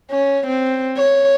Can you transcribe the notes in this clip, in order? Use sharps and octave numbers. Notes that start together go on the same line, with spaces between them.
C#4
C4
C#5